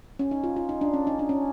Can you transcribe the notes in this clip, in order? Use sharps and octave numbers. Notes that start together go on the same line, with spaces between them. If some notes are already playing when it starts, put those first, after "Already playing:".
C#4
D#4
F4
F4
D#4
D4
C#4
D#4
D4
C#4